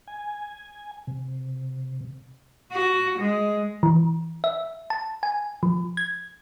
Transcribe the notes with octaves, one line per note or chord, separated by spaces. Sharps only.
G#5
C3
F#4
G#3
E3
E5
A5
G#5
F3
G#6